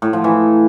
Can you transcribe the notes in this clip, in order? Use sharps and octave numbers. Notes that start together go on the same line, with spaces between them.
A2
F3
E3